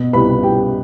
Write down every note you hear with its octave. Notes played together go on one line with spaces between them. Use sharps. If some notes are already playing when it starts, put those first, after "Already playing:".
Already playing: B2
C2 B4 B5
C2 G4 G5